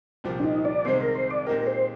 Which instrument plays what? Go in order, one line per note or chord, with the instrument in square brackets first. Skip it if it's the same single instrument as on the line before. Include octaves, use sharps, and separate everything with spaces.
[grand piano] C2 A#2 F3 C4 G4
[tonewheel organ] D4
D#4
D5
[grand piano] C2 C3 D#3 G#3 C4 [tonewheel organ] C5
[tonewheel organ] A#4
C5
D5
[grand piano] A#2 G#3 C4 D#4 G4 [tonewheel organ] A#4
[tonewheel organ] C5